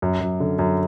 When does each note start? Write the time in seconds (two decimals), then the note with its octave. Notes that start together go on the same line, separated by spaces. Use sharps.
0.02 F#2
0.20 F#2
0.40 D3
0.59 F#2